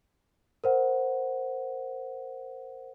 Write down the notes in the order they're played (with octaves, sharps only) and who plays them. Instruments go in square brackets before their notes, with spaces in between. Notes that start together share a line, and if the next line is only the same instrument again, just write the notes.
[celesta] A#4 C5 F#5